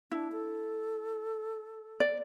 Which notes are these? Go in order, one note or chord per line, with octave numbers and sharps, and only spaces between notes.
D4 E4
A4
D5